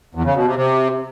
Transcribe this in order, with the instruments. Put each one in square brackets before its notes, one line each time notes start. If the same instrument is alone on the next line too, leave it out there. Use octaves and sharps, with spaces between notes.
[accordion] E2
C#3
B2
C3
C3